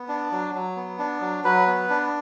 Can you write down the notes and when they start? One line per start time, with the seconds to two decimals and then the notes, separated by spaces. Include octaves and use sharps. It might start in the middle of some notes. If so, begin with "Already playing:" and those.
Already playing: B3
0.08 D4
0.32 F#3
0.54 F#3
0.76 B3
0.99 D4
1.21 F#3
1.44 F#3 B4
1.67 B3
1.90 D4